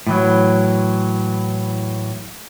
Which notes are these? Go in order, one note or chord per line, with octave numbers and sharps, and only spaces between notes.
A2 E3 F#3